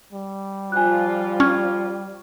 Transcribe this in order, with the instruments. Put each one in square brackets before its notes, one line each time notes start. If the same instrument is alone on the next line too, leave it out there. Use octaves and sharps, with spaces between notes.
[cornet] G3
[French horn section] F3 F4 [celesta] G#5 F#6
[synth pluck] C#4 [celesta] C#6 F6 G#6